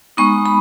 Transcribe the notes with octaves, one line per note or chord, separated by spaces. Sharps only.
G#3 B3 D#4 C#6
B5